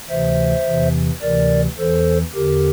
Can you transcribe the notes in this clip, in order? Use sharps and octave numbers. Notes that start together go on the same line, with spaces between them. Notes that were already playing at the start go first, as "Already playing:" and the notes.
D2 C3 E3 C5 E5
E2 C3 E3
D2 C3 E3 A#4 D5
E2 E3 A4 C5
E2 D3 G4 A#4